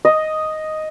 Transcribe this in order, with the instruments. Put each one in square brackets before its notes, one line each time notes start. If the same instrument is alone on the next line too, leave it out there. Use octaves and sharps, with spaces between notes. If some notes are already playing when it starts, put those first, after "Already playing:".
[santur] D#5